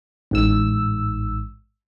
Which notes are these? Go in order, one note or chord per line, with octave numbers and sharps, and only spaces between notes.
A1 G#2 E6